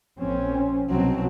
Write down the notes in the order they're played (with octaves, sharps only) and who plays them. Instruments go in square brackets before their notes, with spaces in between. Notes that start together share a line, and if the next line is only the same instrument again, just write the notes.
[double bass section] A#1 C4 C#4
[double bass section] C2 B2 [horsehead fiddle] F#3 C4